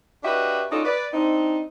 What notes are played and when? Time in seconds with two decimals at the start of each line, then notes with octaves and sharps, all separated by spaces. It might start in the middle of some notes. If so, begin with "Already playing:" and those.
0.23 D4 F#4 G4 B4 D#5 E5
0.72 C#4 D#4 F4 F#4 A4 D5
0.85 B4 D5
1.13 C4 D4 D#4